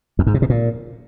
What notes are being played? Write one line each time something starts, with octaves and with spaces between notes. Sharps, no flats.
E2
G#2
C3
B2
A#2